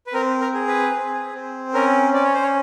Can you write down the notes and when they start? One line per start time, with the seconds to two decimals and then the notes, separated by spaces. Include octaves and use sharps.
0.07 B4
0.13 C4 A#4
0.41 A#4
0.54 G#4
0.68 B4
0.93 C4
1.34 C4
1.74 C#4 A#4
2.14 C#4 D5
2.24 C#5
2.34 C5
2.43 C#5